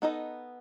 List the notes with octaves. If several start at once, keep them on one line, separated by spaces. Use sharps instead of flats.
B3 D#4 A4 D#5